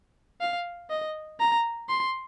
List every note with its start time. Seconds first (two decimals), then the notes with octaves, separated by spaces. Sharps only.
0.41 F5
0.90 D#5
1.40 A#5
1.89 C6